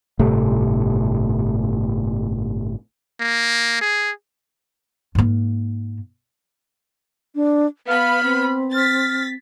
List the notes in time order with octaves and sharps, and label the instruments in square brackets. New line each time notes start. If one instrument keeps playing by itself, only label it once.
[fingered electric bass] G1 A2 C3 A3
[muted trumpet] A#3
G#4
[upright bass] G#2 A#3
[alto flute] D4
[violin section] B3 B5 [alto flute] F5 [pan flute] F6
[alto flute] C4
[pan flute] F6 [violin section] A6 B6